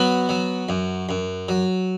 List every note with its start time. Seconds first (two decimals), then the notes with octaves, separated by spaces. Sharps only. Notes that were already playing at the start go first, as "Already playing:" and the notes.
Already playing: F#3 B3 F#4
0.29 F#3
0.69 F#2
1.09 F#2
1.49 F#3